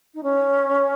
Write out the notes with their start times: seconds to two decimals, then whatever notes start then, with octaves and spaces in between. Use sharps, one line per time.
0.14 D#4
0.23 C#4